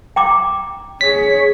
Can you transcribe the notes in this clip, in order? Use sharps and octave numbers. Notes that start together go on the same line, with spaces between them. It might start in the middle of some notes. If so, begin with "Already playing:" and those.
G5 A#5 D6
G#4 C#5 B6